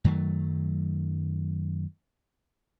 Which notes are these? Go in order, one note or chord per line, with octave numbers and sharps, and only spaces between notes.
F#2 D#3 F#3 A3